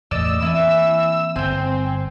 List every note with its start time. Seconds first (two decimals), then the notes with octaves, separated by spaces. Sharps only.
0.11 E2 A2 D5 D#5 E6
0.42 E3 A#3 C4 E4 G#5
1.36 G1 C4 G5 G#5